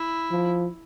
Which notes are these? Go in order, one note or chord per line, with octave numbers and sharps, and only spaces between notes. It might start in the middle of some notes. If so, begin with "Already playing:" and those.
Already playing: E4
F3